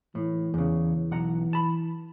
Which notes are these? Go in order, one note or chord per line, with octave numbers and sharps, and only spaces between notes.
A2 E3
E2 C#3
B1 F#5 A#5
A5 B5